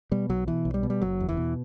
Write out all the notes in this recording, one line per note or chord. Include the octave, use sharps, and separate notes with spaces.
B2 G3
B1 F#3
B2 E3
B1
G3
B2
G3
F#1 F#3
E2
E3
B2